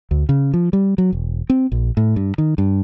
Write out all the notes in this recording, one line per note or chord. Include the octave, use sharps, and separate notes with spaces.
D2
C#3
F3
G3
F#3
E1
C4
A#1
A2
G2
D#3
G2